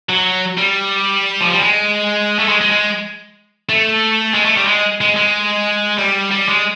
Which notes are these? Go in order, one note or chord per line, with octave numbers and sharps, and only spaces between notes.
F#3
G3
F3
G3
G#3
A3
G#3
G#3
G#3
A3
G#3
A3
G3
G#3
G#3
G#3
G3
G3
G#3